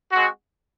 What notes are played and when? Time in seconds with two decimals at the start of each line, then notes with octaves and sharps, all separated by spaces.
0.11 G#3 C4 F#4